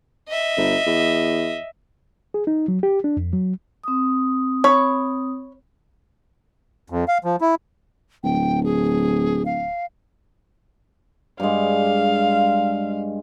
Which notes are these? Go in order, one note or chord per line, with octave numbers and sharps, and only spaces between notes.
D#5 E5
G1
E2
G#4
D#4
F#3
G4
D4
F2
F#3
C4 D#6
C#5 B5
F2
F5
F3
E4
D1 G5
G#4
F5
G2 G#3 F5